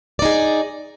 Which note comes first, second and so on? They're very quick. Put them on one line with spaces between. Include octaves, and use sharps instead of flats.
D5 D#4 G#4